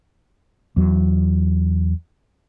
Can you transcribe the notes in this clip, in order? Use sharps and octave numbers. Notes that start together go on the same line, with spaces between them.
E2 F#3